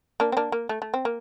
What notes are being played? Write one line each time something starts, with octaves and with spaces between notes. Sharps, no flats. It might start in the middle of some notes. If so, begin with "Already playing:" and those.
A#3 D4
C4
A#3 D4
A#3
A3
A3
C4
A#3